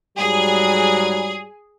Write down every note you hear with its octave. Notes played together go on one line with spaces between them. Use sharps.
G#2 F#3 G3 G#4